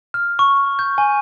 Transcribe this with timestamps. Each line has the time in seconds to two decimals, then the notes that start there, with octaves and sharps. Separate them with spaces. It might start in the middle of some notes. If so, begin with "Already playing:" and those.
0.14 F6
0.39 C#6
0.79 G6
0.98 G#5